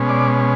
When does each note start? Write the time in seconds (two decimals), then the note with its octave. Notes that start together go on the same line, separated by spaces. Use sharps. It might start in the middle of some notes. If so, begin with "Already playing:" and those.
Already playing: B2 G#3 C#4
0.09 D5